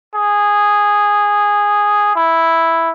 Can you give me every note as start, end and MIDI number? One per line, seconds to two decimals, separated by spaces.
0.15 2.15 68
2.16 2.90 64